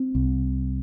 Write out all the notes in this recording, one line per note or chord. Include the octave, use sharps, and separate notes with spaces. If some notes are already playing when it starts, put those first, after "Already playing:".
Already playing: C4
C2